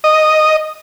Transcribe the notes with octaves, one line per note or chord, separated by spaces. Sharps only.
D#5